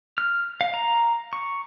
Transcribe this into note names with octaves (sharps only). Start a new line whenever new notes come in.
F6
F5
A#5
C#6